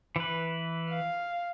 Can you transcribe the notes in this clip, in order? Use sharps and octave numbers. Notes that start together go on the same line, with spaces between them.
E3 B4
F5